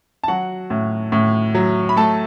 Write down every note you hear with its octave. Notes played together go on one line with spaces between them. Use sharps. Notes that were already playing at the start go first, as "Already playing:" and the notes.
A5
F#3 F#4 F#5
A2
A2
F#3
B5
A3 A4 A5